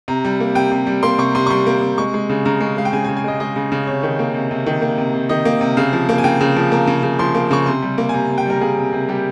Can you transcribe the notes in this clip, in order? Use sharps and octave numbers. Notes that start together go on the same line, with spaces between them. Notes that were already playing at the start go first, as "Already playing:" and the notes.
C3 A#5
G3
A#3
C3 G5
C3
G3
A#3 C6
C3 C#6
C3 C6
C#6
G3 C6
A#3
C3
G#3 C#6
G#3
C#3
C#3 A#5
G#3
G#3 F5
G5
C#3 G#5
G#5
C#3
G#5
G#3 D#5
G#3 D#5
C#3
C#3
C3 C#5
D#3
A#3
C3
C3
D#3
A#3
C3
C3
D#3 D#5
A#3
C3
C#3 F5
F3
A#3
G#5
C#3 G5
C#3
F3
A#3 A#5
C#3
C#3
F3 C6
A#3
C#3 C#6
C3 C6
G3
A#3
G#5
C3 A#5
C3
G5
G3 A#4
A#3 G#4
C3
C3
G3 G4